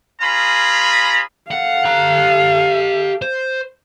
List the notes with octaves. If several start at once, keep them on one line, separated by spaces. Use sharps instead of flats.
C#4 F4 G#4 A#5 B5
A4 F5 F#5
G4 A#5
C5